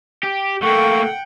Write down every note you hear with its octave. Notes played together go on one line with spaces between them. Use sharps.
G4
A3 A#3 A4 F#5 G5 C#6